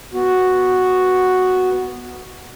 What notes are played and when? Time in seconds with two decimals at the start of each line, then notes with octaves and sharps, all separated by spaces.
0.14 B3 F#4